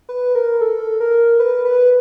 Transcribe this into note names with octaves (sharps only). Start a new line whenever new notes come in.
B4
A#4
A4
A#4
B4
B4